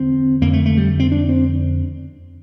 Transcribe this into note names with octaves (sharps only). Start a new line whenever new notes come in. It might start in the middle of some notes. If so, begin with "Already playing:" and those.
Already playing: E2 D3 C4
F2 D3 A#3
A3
A3
G3
C4
D4
C4